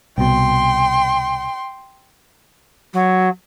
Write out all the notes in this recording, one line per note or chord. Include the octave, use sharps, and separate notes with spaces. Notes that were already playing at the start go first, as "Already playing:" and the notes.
C2 B2 G5 C6
F#3